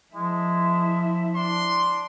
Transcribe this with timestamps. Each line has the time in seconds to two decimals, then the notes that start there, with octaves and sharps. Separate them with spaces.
0.15 F3 G#3 E4 E5
1.35 D4 C6